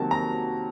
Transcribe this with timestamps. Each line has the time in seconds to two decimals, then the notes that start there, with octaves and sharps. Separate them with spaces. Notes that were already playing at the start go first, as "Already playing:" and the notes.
Already playing: C3 D#3 F#3 A#3 A5
0.11 A#5